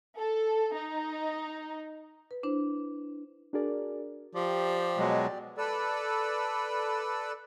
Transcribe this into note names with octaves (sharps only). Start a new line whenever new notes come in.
A4
D#4
B4
D4 E4 C5
D4 F#4 G#4 A#4 D5
F3 G4 D5
B2 F#3 G#3
A4 B4 D5 E6